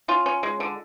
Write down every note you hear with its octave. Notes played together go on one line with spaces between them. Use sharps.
C#4 F4
C#4
G#3
D3